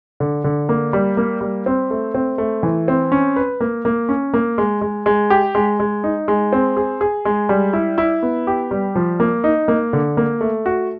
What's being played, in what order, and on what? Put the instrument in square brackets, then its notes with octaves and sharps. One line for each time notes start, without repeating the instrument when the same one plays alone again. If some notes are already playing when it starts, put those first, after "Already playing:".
[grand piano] D3
D3
A#3
G3
A#3
G3
C4
A3
C4
A3
E3
C4
C#4
B4
A#3
A#3
C#4
A#3
G#3
G#3
G#3
G4
G#3
G#3
D#4
G#3
C4
G#4
G#4
G#3
G3
E4
E4
B3
G4
G3
F3
A#3
D#4
A#3
D3
A#3
A3
F#4